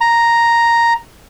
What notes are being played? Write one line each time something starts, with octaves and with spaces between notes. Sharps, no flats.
A#5